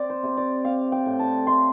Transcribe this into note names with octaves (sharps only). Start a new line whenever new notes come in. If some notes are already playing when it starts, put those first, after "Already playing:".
Already playing: C4 D5
C5
C3
D5
C4 F5
G5
A2
A5
A3 C6